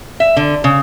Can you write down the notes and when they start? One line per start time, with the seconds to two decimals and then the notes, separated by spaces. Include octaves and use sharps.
0.20 E5
0.37 D3
0.64 C#3